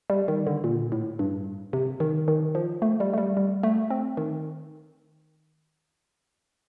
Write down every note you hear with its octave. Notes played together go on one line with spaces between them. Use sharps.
G3
D#3
D3
A#2
A2
G2
C3
D#3
D#3
F3
A3
G3
A3
G3
G3
A3
C4
D#3